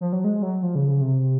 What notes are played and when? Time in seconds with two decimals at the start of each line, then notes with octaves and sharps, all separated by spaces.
0.01 F3
0.13 F#3
0.24 G#3
0.43 F#3
0.63 F3
0.75 C#3
0.88 C#3
1.01 C3